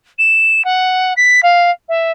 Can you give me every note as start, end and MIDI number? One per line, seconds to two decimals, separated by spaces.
0.18 0.64 100
0.64 1.13 78
1.16 1.40 95
1.43 1.70 77
1.88 2.11 76